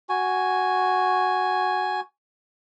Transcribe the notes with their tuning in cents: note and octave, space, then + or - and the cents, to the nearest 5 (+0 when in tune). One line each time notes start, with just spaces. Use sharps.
F#4 +0 G#5 +0